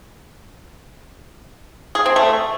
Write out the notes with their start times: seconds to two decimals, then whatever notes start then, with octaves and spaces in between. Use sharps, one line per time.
1.95 G#4
2.06 C4
2.16 A3